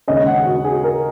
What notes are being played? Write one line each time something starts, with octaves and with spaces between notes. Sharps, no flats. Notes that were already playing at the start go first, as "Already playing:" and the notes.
D#2 C#3 G#3 C#4 D#5
F#5
F#4
G#4
A#4